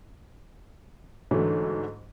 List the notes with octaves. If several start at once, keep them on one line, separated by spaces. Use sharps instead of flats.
G#2 D3 E3 F#3 A3